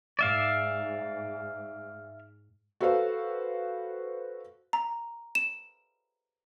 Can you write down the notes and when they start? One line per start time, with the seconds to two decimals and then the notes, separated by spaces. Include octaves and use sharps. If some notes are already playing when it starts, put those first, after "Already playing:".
0.19 G#2 D5 E5 F5
2.81 F#4 A4 B4 C5 F5
4.73 A#5
5.35 E7